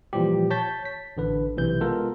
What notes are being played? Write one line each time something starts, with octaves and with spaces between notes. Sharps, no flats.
A#2 E3 F3 G3 G4
C#5 A5 G6 A6 B6
B6
A1 D3 B4
B1 C3 E3 G6
G#3 B3 F4 A4 A#4